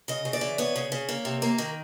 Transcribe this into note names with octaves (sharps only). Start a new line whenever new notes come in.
C#3 D#5
C#3
D5
E3
B3 C#5
C#3
C#3
A#3
C3
A#3
D#3